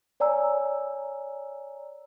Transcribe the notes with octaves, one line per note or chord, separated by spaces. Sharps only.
C#5 D5 G#5 A#5 E6